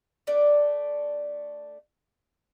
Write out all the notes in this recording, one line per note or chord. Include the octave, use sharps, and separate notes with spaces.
A3 D4 D5